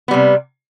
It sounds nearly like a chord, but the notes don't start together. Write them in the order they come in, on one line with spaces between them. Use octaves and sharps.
B3 G3 C3